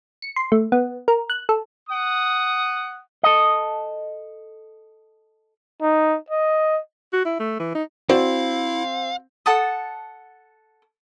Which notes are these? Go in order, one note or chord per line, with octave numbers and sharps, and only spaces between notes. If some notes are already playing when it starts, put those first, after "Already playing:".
C#7
C6
A3
B3
A#4
F#6
A4
F#5 D#6
A4 D#5
D#4
D#5
F#4
E4
A3
E3
D#4
C4 E4 F#4 C5 D5 F5
A4 F#5 A5 D#6